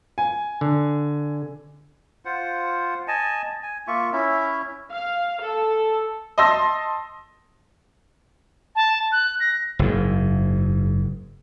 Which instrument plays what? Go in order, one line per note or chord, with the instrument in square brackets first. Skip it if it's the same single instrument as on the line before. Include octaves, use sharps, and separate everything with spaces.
[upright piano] G#5
[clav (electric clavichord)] D3
[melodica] F4 C5 F#5
D#5 G#5 A5
G#5
A#3 F4 E5 C#6
C#4 E4 E5
[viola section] F5
A4
[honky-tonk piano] D#5 A5 C6 E6 A#6
[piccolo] A5
F#6
A#6
[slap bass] F#1 G#2